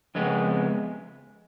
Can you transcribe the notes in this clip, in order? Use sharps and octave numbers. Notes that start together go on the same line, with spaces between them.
F2 C#3 G#3 B3